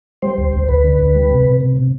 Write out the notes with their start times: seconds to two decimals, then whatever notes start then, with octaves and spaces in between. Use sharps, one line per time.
0.22 G3 C5
0.38 D2
0.53 D2
0.68 D2 B4
0.84 D3
0.99 D2
1.14 G3
1.30 C3
1.46 C3
1.61 C3
1.77 C3